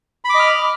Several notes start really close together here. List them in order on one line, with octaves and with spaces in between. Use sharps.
B5 D6 D#5 F6